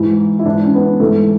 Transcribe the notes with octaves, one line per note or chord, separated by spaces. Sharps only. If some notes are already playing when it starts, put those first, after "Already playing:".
Already playing: G#2 E3 E4
E4
G#2 E3 D4
C#4
B3
C#4
G#2 E3 A3